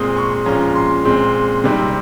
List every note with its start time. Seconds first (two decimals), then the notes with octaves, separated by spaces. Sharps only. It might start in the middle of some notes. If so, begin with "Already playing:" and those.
Already playing: A#2 G#3 C4 D#6
0.17 C#6
0.46 A#2 F3 G#3 C#4 A#5
0.68 A#5
0.76 C6
1.05 A#2 G#3 C4
1.64 C3 D#3 G3 C4